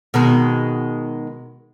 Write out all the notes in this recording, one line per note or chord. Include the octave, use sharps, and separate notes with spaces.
B2 D#3 G#3